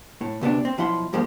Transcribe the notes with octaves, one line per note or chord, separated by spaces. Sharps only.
A2
D2 C3 B3 D4
C4
B1 F3 E4 F#5 C6
E2 G2 F3 G3 G#3 A#3